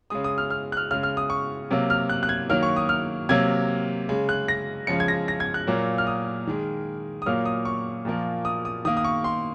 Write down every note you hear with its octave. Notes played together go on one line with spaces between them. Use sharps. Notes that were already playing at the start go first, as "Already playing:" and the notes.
C#3 G#3 D#6
D#6
F6
F6
F#6
F6
C#3 G#3 F6
F6
D#6
C#6
C3 F#3 A#3
F6
F#6
F#6
G#6
D#3 F#3 A#3 F6
C#6
D#6
F6
C3 F#3 A#3 G#6
C#3 G#3
F#6
A#6
C#3 F3 G#3 C#7
G#6
A#6
A#6
G#6
F#6
A#2 F#3 A#3
F6
D#6
D#3 G#3
D#6
A#2 F#3 A#3 F6
D#6
C#6
A#2 F3 A#3
D#6
D#6
D#3 A#3 D#6
D#6
C#6
C6